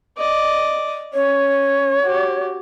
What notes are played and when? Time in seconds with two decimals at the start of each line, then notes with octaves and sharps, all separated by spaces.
0.18 D5 D#5
1.14 C#4 C#5
2.02 F#4 G4